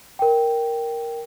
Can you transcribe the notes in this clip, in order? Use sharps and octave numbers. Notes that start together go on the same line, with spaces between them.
A#4 G5